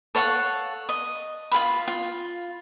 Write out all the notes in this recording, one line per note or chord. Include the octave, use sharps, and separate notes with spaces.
A4 C#5 F5 F#5
D#5
F4 G#4 F5 B5
F4